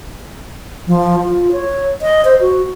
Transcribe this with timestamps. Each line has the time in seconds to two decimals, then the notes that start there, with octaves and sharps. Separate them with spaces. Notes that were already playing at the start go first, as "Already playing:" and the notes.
0.87 F3
1.24 F4
1.52 C#5
2.02 D#5
2.25 C5
2.41 F#4